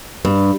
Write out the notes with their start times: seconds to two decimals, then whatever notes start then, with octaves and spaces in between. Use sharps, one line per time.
0.25 G2